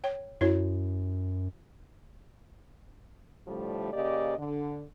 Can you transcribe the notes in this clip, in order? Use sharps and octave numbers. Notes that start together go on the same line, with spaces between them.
C#5 G5
F#2 E4 F#4 C#5
A2 D3 F3 G3 A3
C#3 A#3 G4 D5 D#5
D3